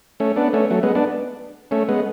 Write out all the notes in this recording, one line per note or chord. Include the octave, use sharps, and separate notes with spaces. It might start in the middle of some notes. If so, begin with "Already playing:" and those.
A3 C#4
B3 D4
A3 C#4
F#3 A3
G#3 B3
B3 D4
A3 C#4
G#3 B3